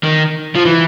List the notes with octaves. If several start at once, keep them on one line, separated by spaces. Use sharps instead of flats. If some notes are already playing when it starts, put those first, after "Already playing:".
D#3
F3
E3